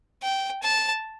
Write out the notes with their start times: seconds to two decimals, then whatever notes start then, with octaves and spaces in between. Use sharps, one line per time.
0.23 G5
0.62 A5